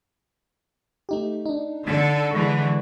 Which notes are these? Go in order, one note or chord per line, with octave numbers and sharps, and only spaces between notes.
A3 D#4 G4
D4 D#4
D3 A4
D3 E3 G#3 C#6